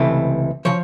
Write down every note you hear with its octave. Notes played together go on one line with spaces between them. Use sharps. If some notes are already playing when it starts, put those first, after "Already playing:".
Already playing: C#2 C3 E3 A3
C#3 F3 C#5